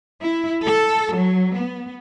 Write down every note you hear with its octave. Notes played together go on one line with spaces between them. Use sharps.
E4
A4
F#3
B3